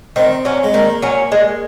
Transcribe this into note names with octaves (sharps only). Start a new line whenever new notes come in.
D#3 C4
F#3 C#4
G#3
D#3 A#3
F#3 C#4
G#3